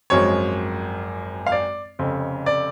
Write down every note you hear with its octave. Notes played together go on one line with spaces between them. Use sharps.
G#1 F#2 F3 G#3 C#5
F5
D5
F1 F2 C#3
D5